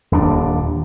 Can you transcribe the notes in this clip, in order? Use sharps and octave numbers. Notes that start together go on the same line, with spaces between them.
D#1 D#2 D4